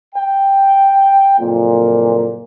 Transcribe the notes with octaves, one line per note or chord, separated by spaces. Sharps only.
G5
F#1 F2 A#2